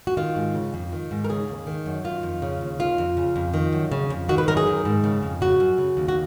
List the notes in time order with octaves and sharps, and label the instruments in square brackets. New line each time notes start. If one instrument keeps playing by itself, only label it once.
[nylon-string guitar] F#4
D#3 F4
G#2
C#3
F2
D#3
G#2
A#4
C#3 G#4
D#2
D#3
F#2
D#3 F4
F2
C#3
D#2
D#3 F4
F2
C#3
F2
D#3
F#2
C#3
F2
D#3 F#4
B4
F#2 A#4
G#4
D#3
G#2
C#3
F2
C#3 F#4
F#2
C#3
D#2
F#4